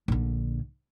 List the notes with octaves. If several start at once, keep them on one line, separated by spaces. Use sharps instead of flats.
A#1 D3